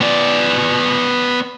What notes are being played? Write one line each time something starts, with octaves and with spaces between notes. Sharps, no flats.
B3 D5